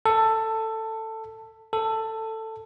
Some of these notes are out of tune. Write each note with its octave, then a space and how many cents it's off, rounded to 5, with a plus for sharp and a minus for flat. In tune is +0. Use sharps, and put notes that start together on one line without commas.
A4 +15
A4 +15